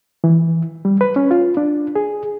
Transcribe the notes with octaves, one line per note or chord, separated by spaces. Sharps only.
E3
G3
B4
C#4
F4
D4
G#4